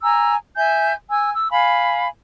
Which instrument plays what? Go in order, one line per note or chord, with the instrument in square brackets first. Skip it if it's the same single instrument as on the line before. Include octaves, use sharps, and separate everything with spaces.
[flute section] G#5 A#5 E6
E5 G#5 G6
G#5 E6
E6
F5 G#5 B5